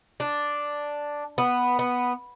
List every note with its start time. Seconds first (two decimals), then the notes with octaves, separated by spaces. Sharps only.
0.20 D4
1.38 B3
1.79 B3